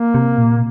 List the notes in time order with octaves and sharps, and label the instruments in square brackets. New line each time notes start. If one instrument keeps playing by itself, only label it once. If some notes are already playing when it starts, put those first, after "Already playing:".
Already playing: [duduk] A#3
[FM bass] C3
A#2